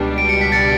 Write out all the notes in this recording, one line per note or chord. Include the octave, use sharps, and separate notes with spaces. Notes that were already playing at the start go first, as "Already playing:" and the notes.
Already playing: C#2 B2 G3 D4
D7
C#7
B6
A6 C#7